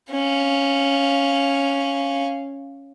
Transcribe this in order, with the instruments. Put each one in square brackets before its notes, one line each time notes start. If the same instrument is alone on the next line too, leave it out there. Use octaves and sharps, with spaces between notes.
[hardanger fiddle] C#4 F5